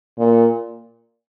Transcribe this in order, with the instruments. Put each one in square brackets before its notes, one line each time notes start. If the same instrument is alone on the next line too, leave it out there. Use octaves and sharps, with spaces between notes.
[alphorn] A#2